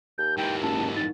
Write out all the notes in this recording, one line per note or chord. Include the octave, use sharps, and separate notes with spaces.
D#2 G6
G#2 E3 G5
F#1 A5
D#3 A6